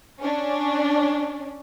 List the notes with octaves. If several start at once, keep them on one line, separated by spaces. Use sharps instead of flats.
C#4 D4